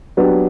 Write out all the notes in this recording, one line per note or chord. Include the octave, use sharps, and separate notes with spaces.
F#3 B3 D4 G4